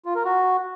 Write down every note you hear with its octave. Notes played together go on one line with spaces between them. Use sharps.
F4
A#4
F#4